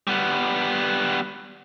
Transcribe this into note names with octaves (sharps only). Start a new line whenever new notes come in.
G3 B3